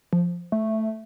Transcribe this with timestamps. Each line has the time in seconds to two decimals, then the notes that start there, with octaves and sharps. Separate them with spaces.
0.13 F3
0.52 A3